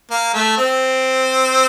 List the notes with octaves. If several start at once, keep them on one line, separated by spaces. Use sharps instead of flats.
A#3
A3
C4